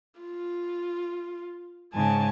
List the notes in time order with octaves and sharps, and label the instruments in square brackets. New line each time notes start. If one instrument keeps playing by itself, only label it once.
[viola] F4
[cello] G#2 C#3 [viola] G#5 A5